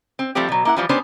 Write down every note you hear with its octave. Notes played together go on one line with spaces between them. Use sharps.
C4
F3 G3 A3 C4 G4
B2 F#3
A#3 E4 F#5
E3 F3 G3
G3 B3 C#4 D4 C5